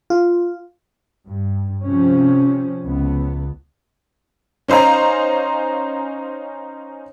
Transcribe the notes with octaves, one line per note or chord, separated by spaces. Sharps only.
F4
G2
C3 F3 C#4
C#2 B3
C#4 D#4 C5 F5 A#5